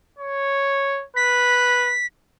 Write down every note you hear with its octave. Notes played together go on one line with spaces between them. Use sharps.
C#5
B4 B6